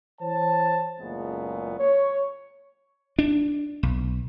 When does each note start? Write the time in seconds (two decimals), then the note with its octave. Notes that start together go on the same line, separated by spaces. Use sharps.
0.21 E3 C5 C#5 A5
1.01 F#1 C#2 A#2 G#3 A3 B3
1.79 C#5
3.19 D4
3.83 B1